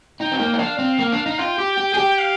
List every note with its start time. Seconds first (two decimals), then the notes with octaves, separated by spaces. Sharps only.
0.20 D#4 G5
0.32 C4
0.40 A#3
0.54 D#4
0.59 D4 F5
0.79 C4
0.99 A#3
1.13 D4
1.26 D#4
1.39 F4 G5
1.59 G4
1.78 G4
1.94 G#4
1.98 G4
2.19 F5